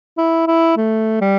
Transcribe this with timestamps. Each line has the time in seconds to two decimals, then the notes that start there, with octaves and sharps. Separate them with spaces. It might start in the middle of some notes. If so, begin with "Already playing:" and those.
0.18 E4
0.47 E4
0.77 A3
1.21 G3